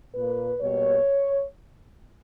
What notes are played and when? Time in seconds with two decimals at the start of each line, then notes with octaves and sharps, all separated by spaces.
0.14 A#2 A#3 B4
0.61 B2 G3 A#3 C#5